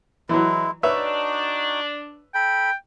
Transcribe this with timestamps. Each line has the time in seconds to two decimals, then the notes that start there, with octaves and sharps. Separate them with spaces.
0.29 E3 F#3 G#3 E4
0.83 D4 D#4 F#4 B4 C#5 E5
2.35 A4 G5 B5